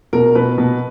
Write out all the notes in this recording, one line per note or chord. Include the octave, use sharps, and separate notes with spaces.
B2 A#4
B2 B4
B2